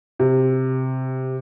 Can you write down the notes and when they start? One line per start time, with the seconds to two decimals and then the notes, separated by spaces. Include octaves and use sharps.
0.19 C3